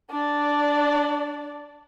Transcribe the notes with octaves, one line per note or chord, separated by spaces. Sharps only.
D4 D5